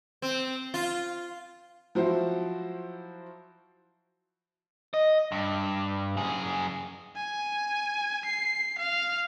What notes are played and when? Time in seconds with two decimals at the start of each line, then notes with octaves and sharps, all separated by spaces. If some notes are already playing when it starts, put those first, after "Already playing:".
0.22 C4
0.74 F4
1.95 F3 F#3 E4 F#4 C5
4.94 D#5
5.32 G2
6.17 F#2 G#4
7.16 G#5
8.26 C7
8.79 F5